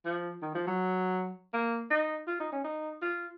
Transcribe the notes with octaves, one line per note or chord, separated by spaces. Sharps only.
F3
D#3
F3
F#3
A#3
D#4
F4
D#4
C#4
D#4
F4